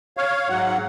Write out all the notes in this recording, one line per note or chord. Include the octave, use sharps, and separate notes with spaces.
C#5 F5
G#2 F#3 F#5